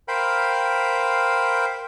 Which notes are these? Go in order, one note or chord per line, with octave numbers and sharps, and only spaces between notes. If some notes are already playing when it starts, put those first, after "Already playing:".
A#4 C5 F5 G5 B5